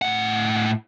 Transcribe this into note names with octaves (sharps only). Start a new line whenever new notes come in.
A2 F#5